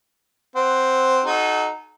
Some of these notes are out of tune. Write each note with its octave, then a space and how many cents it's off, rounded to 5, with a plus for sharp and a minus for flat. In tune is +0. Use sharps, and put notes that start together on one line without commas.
C4 +0 F#5 +0
D#4 -10 F#4 +0 A4 -40